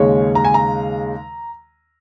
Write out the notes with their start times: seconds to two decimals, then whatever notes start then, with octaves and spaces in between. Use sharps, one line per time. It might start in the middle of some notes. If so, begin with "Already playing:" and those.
Already playing: D#2 C#3 G#3 C#5
0.35 A#5
0.45 G#5
0.54 A#5